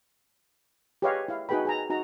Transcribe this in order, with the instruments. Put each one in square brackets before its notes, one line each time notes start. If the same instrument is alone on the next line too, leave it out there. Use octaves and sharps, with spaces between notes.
[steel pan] G4 G#4 B4 C#5 D#5 F5
E4 F5
D#4 F#4 G#4 B4 G5 B5
G#4 G#5 A#5
D#4 F#4 A#5